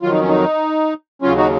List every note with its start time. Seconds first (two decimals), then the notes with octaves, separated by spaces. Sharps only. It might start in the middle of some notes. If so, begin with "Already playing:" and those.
0.02 F2 D#3 F#3 F4
0.11 D#4
0.20 C#4
0.29 D#4
1.22 D#2 C#3 F#3 C#4 F4
1.37 D#4 F#4